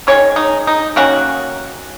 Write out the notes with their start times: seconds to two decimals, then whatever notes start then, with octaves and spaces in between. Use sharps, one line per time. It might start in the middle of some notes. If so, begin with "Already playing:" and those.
0.07 D#3 G#3 C#4 C#5
0.36 D#4
0.67 D#4
0.96 D#3 A#3 C#4 F#4